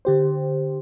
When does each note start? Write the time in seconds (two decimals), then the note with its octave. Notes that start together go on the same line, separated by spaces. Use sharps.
0.05 D3 G4 C5